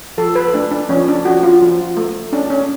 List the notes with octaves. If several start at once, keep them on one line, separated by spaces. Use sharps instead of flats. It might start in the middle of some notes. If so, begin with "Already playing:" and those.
F3 A4
B4
A3 D4
D4
F3 C#4
D4
F3 F#4
F4
F3
A3
C#4 D4
C#4